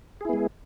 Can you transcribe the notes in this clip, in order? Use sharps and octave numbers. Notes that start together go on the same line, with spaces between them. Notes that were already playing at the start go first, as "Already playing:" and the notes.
G#3 B3 E4 G#4